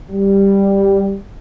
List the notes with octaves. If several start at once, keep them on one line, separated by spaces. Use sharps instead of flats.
G3